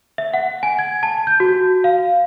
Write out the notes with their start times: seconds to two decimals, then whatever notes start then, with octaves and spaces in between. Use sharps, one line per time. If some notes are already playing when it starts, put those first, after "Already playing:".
0.18 E5
0.34 F#5
0.63 G#5
0.79 G#6
1.03 A5
1.27 G6
1.40 F#4
1.84 F5